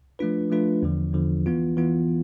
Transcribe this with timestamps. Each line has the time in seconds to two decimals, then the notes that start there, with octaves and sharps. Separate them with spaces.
0.19 F3 A3 D4 F4 B4
0.50 F3 A3 D4 F4 B4
0.83 E2 D3 F3
1.14 E2 D3 F3
1.46 E3 B3 F4
1.77 E3 B3 F4